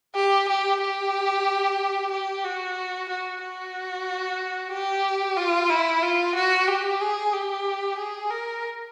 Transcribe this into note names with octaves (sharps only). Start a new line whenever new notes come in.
G4
G4
G4
G4
F#4
F#4
F#4
G4
F4
E4
F4
F#4
G4
G#4
G4
G#4
A#4